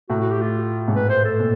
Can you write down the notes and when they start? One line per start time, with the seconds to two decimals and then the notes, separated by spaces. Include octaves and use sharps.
0.09 A2 F#4
0.21 F#4
0.31 G4
0.42 F4
0.88 G#2
0.96 A2 B4
1.10 C5
1.25 A4
1.40 A#2